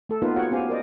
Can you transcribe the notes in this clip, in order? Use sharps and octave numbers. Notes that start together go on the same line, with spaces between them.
A3 A4
A#3 B3 D#4 F4 A#4 B4
F#4 G4 C#5 F#5 G5
B3 C#4 G4 C5 F5 G#5
A#4 C5 D5 D#5